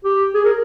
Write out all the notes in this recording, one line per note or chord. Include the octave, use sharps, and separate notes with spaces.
G4
G#4
A#4